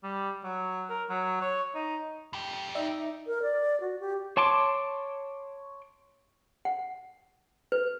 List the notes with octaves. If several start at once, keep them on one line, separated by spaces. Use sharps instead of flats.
G3
F#3
A#4
F#3
C#5
D#4
F2 G4
D#4 D5 E5
A#4
D5
F#4
G4
C#5 A5 C6 D6
F#5
B4